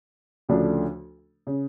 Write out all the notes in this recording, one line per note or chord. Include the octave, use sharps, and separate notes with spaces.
D2 C#3 F3 A3 D4
C#3